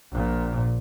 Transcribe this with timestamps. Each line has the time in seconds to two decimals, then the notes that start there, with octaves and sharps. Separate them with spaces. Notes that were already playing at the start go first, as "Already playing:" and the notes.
0.12 A#1 A#2